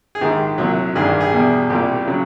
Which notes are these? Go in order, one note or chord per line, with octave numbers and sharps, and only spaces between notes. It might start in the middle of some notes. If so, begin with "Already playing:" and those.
G#4
A#1 G#2 D#3 G#3 G4
C2 A#2 F#3
A1 G2 D#3 G3 G#4
G4
G#4
E2 B2 G3
C2 A#2 G3 G4
C#3 F#3